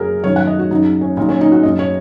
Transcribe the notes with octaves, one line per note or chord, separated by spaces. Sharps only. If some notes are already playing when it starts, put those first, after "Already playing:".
Already playing: F#2 C#3 F#3 G#4 A#4
F#2 D#3 F#3 C#5
F#5
D#5
F#4
F#2 C#3 F#3 D#4
C#4
A#2 F#3 D#4
C#4
D#4
F#4
F#2 F#3 D#5
C#5